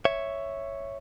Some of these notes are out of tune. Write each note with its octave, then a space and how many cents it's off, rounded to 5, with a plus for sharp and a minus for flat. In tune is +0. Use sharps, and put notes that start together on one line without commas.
C#5 +0 E5 +0